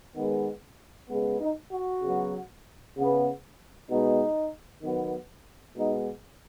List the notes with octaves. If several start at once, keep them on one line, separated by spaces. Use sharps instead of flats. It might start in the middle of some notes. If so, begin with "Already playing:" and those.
D#3 G#3 B3
C#3 G#3 B3
D#4
F#4
C#3 F#3 B3
C#3 B3
B2 G#3 B3 D#4
D#3 F#3 B3
B2 G#3 B3 D#4